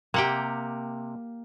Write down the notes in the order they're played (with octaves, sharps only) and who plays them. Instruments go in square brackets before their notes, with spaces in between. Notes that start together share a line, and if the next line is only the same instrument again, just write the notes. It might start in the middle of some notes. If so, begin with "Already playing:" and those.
[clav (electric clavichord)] C3 F#5 G5 [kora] A#3 G4